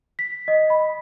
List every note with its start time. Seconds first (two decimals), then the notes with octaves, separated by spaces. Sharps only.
0.19 B6
0.48 D#5
0.70 B5